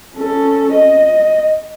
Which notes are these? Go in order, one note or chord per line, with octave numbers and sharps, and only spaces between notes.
C#4 A4
D#5